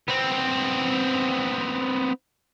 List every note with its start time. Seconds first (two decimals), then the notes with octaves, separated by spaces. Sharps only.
0.08 B3 C4